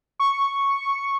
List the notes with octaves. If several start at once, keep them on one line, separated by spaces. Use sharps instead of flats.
C#6